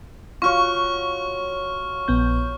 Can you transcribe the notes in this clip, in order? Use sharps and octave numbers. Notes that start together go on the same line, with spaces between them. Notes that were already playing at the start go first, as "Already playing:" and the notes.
F4 F#4 C#5 C#6 F6
A#1 B3 G6